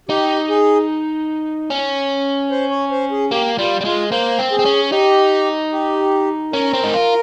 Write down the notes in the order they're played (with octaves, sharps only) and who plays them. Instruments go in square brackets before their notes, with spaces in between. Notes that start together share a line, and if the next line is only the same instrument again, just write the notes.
[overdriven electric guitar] D#4 [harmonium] G4
[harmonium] G#4
[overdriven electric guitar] C#4
[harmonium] C5
C#5
C5
G#4
[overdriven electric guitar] A#3 [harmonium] G4
[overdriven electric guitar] G3 [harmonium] F4
[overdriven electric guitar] G3
[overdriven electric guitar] G#3 [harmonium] F4
[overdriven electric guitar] A#3 [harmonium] C5
[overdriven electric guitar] C4
[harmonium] G#4
[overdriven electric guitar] C4
C#4
[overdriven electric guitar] D#4 [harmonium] G4
[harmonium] G4
[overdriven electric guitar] C#4 [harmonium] A#4
[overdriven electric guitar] C4
D#4
F4